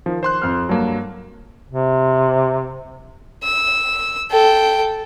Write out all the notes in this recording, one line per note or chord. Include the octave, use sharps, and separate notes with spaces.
D#3 F3
C5 C6 F#6
F2 F6
G2 F#3 A#3 A5
C3
E6
A4 G5